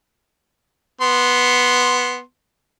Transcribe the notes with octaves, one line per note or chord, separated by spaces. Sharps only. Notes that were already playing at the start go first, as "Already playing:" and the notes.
B3 C6